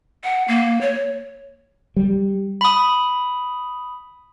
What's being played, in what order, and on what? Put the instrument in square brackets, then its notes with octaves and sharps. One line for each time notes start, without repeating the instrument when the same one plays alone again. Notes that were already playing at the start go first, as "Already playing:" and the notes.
[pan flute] F#5
A#3
C#5
[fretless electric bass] G3
[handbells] B5 D#6